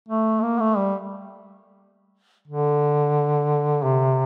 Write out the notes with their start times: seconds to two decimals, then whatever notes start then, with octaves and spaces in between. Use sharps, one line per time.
0.09 A3
0.42 A#3
0.60 A3
0.77 G3
2.48 D3
3.84 C3